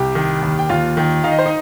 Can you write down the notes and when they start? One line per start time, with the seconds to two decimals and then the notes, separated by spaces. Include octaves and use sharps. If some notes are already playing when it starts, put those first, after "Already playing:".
Already playing: C2 G4 G5
0.15 D#3
0.42 D#2
0.59 G5
0.69 D#2 F4 F5
0.97 D#3
1.24 D#4 F5
1.31 D#5
1.39 C5
1.46 D#4 D#5